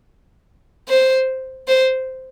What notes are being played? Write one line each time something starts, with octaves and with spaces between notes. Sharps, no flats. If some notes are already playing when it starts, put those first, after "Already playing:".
C5
C5